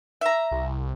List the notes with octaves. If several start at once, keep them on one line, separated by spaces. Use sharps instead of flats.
E5 A#5
C2